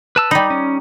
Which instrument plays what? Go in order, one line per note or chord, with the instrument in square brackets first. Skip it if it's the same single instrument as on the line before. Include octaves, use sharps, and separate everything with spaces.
[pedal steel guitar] B4 A5 E6
[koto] G3 D#4 [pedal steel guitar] B5
[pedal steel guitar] C#4